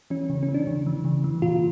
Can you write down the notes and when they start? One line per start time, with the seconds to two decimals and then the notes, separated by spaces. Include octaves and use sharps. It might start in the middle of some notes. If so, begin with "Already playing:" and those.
0.10 E3 C#4
0.30 C#3
0.43 C#4
0.48 E3
0.54 D4
0.67 C#3
0.87 E3
1.05 C#3
1.24 E3
1.42 A#2 F4